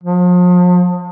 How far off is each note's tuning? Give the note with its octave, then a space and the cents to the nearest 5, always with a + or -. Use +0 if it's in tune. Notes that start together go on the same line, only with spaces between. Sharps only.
F3 +40